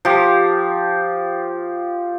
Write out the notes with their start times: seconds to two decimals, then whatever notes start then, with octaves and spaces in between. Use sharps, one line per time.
0.05 F3 G4